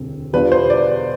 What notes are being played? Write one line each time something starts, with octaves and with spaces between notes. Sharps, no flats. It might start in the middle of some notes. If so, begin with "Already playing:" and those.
Already playing: E1 D2 D3 G3 C4
E2 B2 G3 D4 F4 B4
C5
D5